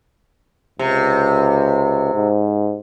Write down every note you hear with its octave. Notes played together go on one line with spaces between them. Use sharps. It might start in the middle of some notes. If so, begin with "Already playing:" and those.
C#2 C3
G#2